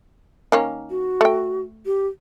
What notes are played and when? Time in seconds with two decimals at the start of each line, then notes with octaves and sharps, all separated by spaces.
0.52 D#3 A#3 C#4
0.90 F#4
1.21 A3 G5
1.86 G4